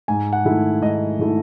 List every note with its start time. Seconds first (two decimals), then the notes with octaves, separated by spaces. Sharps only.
0.08 G#2 G#5
0.33 F#5
0.45 D#3 A3 E4
0.82 G#2 D#5
1.19 D#3 A3 E4